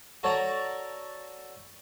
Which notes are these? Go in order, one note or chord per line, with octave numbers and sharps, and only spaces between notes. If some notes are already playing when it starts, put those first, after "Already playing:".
F#4 A4 C#5 D5 F#5 A#5